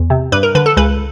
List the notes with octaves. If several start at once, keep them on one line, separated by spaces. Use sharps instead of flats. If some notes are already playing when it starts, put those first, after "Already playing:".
Already playing: E2
C3
G2 B4
A#4
D3 B4
A4
C#2 B4